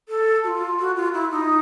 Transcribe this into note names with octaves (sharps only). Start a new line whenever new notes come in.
A4
F#4
F4
F#4
F4
E4
D#4